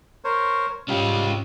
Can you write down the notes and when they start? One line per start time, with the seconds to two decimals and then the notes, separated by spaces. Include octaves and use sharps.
0.24 A#4 C5 C#5
0.88 G#2 G3 C#4 F4